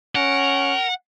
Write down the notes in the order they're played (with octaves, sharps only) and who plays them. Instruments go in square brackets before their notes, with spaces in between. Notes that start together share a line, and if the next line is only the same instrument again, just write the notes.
[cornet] C#4 [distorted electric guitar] A#4 [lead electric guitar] F#5